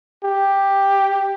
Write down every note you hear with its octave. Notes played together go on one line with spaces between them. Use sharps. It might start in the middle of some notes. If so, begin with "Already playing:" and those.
G4